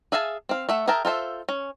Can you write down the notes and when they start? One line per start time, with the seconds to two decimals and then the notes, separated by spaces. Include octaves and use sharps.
0.12 G#4 E5 F5 G#5 A5
0.49 C4 F5
0.69 A3 E5 F#5
0.88 G#4 A#4 E5 G5 A5
1.05 F4 A4 C5 E5
1.49 C#4